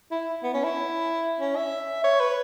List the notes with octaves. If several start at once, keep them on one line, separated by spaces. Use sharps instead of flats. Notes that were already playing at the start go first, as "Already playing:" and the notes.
E4
B3
C#4
E4
C#4
E5
C#5
B4